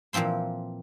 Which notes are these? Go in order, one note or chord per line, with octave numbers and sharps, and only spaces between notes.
A#2 E3 F3 C4 C5